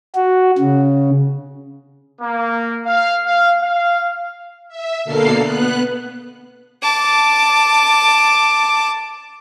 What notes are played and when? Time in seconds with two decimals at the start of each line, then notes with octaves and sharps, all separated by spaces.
0.15 F#4
0.58 C#3
2.21 A#3
2.86 F5
3.25 F5
3.62 F5
4.68 E5
5.05 B2 D3 A#3 A4 F5 C7
5.40 B3 F#6
6.82 A5 D6